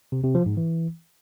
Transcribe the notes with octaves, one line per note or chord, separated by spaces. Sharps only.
C3
C3
F3
G#2
E3